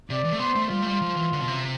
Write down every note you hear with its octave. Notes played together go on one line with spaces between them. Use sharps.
C3 D5
E3
A3
B3 C5
A3
G3 F4
A3
G3
F3
E3
D3
B2
C3